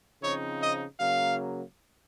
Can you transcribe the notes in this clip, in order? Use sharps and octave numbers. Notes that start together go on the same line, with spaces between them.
C#3 F3 C4 D#4 C#5
D#5
C#3 F#3 A#3 F5